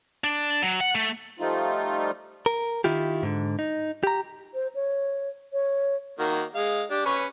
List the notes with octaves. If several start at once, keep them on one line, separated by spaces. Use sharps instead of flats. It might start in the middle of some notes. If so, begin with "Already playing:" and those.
D4
F#3
F#5
A3
F3 G3 A3 D#4 F4
A#4
D#3 E4 F4 G4
G#2 D3
D#4
G4 A#5
C5
C#5
C#5
D#3 A#3 F#4
G#3 F5
D4 G4
C#4 B4 C#6